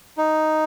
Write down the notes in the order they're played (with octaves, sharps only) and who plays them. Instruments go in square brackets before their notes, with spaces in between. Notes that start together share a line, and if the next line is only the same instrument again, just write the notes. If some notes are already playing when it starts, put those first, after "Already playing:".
[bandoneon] D#4